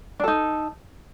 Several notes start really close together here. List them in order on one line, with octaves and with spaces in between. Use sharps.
D4 A4 D#4